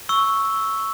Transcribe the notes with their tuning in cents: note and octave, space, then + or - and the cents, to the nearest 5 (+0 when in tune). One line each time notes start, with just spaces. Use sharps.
C#6 +0 E6 -5